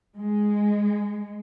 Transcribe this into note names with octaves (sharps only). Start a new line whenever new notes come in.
G#3